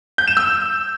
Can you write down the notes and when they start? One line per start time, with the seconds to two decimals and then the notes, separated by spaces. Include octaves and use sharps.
0.18 G6
0.28 E7
0.37 E6